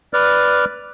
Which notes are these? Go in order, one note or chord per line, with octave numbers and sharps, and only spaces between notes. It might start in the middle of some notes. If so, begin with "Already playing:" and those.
B4 D5 F6